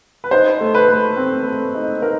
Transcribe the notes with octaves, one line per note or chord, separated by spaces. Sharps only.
B4
D#4 C5
A3
B4
A3
C4
A3
D#4
D#4 A#4